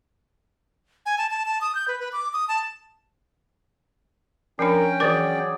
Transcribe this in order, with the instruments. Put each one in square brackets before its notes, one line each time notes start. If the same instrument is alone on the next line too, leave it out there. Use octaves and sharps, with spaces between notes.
[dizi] G#5
A5
A5
A5
D#6
G6
B4
B4
D6
D#6
A5
[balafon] F3 D4 [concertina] C#4 G5 [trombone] A#4
[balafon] E3 A#4 [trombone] F#3 [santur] G#4 D5